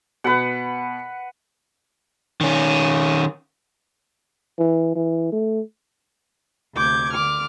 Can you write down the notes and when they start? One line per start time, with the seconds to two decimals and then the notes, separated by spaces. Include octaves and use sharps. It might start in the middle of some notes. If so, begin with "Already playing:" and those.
0.24 B2 B4 F#5
2.41 D#3 C#4
4.59 E3
4.95 E3
5.32 A3
6.74 D2 C3 D6 G6 G#6
7.12 D3 D6 F6